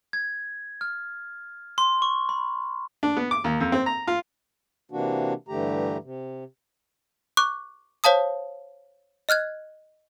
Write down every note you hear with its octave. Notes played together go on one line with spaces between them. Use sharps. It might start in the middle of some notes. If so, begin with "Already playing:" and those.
G#6
F6
C6
C#6
B5
D4
B3
D6
D#2
F2
C4
A#5
F4
C3 E3 A#3 D4 F#4
G2 D3 E3 A3 G4 A#5
C3
C#6 D6 F#6
C5 C#5 F5 A5 D#6
D#5 F6 F#6 G#6